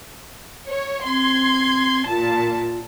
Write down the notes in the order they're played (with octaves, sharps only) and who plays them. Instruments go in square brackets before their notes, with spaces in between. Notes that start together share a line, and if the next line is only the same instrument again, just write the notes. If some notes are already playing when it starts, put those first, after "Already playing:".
[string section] C#5
[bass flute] C4 [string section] C6 G#6
[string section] A#2 A5 [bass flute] F4